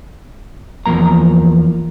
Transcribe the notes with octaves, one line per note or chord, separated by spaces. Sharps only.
E2 F3 A#3 A#5